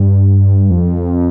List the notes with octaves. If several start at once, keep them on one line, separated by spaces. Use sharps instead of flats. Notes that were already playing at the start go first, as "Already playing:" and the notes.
Already playing: G2
F2